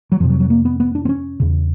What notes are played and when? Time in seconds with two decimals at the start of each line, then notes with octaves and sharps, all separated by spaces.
0.12 F#3
0.20 F2 C3 F3
0.30 F#3
0.40 F#3
0.50 A#3
0.65 B3
0.80 B3
0.95 D4
1.05 C4
1.09 C#4
1.40 E2 C#3